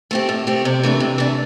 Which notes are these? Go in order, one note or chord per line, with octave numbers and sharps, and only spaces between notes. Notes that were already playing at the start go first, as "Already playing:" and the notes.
A3 C4 G4
A2
A3 C4 G4
C3
E3 A3 D4
C3
E3 A3 D4